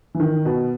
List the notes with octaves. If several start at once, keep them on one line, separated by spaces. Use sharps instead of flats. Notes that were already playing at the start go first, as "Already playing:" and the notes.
E3
D#3
B2